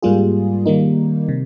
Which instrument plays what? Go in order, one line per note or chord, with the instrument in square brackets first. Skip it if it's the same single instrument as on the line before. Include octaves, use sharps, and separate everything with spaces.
[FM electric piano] G#2 G3 A#3 F4 G#4
D#3 G3 A#3 D#4
C3